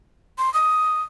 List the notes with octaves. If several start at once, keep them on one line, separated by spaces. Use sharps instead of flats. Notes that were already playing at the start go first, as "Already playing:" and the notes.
C6
D#6